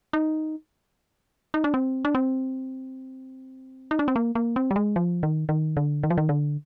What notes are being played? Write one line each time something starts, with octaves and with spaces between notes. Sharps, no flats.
D#4
D#4
D4
C4
D4
C4
D#4
D4
C4
A#3
A#3
C4
G3
G#3
F3
D#3
D#3
D3
D#3
F3
D#3
D3